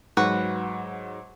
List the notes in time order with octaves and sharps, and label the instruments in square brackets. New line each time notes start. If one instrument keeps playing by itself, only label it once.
[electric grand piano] G#2 F#3 [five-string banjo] F#4 B4